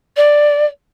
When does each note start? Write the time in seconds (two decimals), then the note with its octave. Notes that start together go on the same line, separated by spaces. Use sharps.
0.16 D5